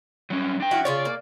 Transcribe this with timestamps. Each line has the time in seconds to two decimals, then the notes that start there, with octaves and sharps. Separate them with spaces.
0.30 F#3 G3 C#4
0.60 D4 G5
0.71 F3 E4 F#4
0.85 C#3 F4 C#5 D5
1.05 A#3